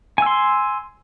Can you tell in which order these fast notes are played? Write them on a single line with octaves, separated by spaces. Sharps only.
G#5 E6 C6